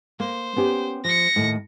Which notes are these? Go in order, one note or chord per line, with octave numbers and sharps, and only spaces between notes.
A#3 C5
B3 C#4 G4
F3 A#6 C#7
D#2 A2